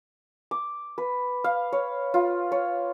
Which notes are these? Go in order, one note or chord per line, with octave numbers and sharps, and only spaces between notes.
D6
B4
F5
C#5
F4
C#5